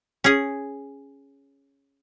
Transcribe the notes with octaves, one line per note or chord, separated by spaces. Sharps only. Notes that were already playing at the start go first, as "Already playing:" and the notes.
C#4 G#4